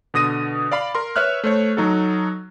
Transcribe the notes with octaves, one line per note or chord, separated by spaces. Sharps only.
B2 D3 D#6 A#6 D#7
D5 F5 B5
A#4 C6
B4 C#5 E5 F6 F#6
A3 C5 C#5
F#3 D#4 F#4 A4